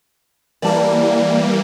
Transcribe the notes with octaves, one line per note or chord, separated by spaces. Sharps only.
E3 G3 A#3 D5 A5